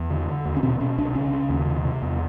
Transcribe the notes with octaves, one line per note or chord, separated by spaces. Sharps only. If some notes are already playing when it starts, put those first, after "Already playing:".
Already playing: E2
D3
D3
D#2
C#4
B2 C4
B2 C#4
C2 D4
C#3 C#4
C#3
D#2
C3
C3
E2